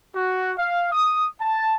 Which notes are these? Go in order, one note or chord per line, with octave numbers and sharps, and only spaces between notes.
F#4
F5
D#6
A5